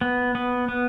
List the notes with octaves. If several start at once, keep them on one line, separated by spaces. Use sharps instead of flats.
B3
B3
B3